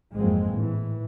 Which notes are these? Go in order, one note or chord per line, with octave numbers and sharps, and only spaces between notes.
G#1 F2 F#3 G#3 A#3 C4
A2 E3